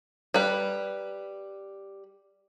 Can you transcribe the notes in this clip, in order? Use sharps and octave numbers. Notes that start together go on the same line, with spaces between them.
G3 B4